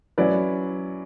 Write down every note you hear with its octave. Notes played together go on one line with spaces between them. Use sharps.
F#3 C#4 E4 B4 D5